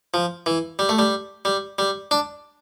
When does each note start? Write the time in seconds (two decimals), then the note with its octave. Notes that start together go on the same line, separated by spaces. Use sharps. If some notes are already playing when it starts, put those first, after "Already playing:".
0.14 F3
0.46 E3
0.79 G3
0.89 A3
0.99 G3
1.45 G3
1.79 G3
2.11 D4